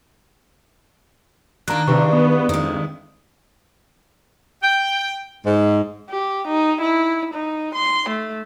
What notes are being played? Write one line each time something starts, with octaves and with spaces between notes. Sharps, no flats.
A#2 D#3 A#3 D4 A#5 F#6
E2 G2 C3 B4 C#6
B3
F2 D#3 G#3 D#6
G5
G#2
G4
D#4
E4
D#4
C6
A3